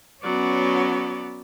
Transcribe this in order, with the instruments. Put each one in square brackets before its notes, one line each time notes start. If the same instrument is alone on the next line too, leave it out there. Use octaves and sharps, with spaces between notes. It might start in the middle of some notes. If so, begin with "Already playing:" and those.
[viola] F#3 D5 [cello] B3 C#4